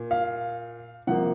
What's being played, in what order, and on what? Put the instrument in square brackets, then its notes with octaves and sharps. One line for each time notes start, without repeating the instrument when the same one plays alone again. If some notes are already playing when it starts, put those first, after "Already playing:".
Already playing: [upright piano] A#2
F5
C3 F3 A#3 F#5